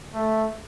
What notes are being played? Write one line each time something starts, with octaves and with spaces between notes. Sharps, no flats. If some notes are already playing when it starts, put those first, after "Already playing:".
Already playing: D3
A3